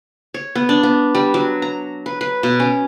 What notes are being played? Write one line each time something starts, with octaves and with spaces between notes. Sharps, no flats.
C#5
B3
D4
B3
G3
F#3
A#5
B4
B4
B2
C#4